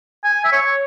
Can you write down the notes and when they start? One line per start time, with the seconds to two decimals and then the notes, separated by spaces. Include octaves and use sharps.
0.24 G#5
0.45 E5
0.52 C#5